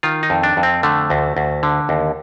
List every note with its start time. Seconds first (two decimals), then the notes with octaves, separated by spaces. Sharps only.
0.03 D#3 F4
0.23 D#4
0.30 F2
0.43 D4
0.57 F2
0.63 C4
0.83 D3 A3
1.10 D2
1.37 D2
1.63 D3
1.89 D#2